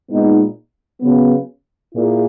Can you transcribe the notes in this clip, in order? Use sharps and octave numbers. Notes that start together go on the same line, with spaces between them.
A#2 G#3 B3 D#4
C#3 F#3 B3
A#2 A#3 E4 G#4